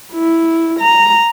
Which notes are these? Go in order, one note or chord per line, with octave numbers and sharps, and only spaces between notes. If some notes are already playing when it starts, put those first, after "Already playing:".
E4
A#5